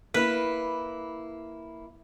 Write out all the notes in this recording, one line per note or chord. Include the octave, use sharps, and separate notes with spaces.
A#3 E4 B4